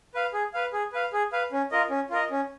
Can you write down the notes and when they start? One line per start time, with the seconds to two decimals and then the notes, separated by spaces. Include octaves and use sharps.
0.14 B4 F5
0.33 G#4
0.54 B4 F5
0.73 G#4
0.93 B4 F5
1.13 G#4
1.32 B4 F5
1.52 C#4
1.71 F4 A#4 D#5
1.90 C#4
2.10 F4 A#4 D#5
2.31 C#4